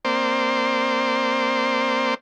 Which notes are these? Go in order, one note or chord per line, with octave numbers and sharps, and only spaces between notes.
A#3 C4 C5 D5